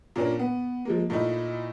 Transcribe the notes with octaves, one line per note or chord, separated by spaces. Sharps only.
A#2 A#3 C#4 D4 A#4
B3
F3 G#3 A#3
A#2 A3 D#4 E4